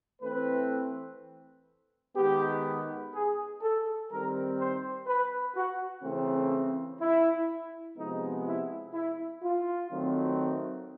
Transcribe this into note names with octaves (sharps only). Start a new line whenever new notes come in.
E3 A3 C4 B4
D#3 G#3 B3 G4
G#4
A4
D#3 G3 C4 A#4
C5
B4
F#4
C#3 E3 A3 C4
E4
C3 F3 G#3 B3 D#4
E4
E4
F4
D#3 F#3 A3 C4